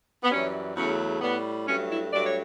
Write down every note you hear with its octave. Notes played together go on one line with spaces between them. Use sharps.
B3
F#2 E3 G3 C#4
E2 C#3 F#3 A3 C#4
A2 G3 B3
G2 F#3 A3 C#4
E4
G2 F#3 A3 D5
C#5